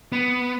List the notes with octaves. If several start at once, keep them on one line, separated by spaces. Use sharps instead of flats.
B3